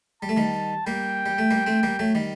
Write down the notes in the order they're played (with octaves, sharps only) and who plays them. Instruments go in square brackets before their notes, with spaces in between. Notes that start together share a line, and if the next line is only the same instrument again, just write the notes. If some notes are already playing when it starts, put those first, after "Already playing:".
[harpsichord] G3 [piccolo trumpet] A5
[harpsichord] A3
D#3 G3
[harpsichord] G3 A#3 [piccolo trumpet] G5
[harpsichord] G3
A3
G3 A#3
A3 C4
G3 A#3
F#3 A3
D#3 G3